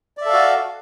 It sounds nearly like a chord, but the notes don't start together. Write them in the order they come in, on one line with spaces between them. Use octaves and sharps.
D5 E5 A4 F5 F#4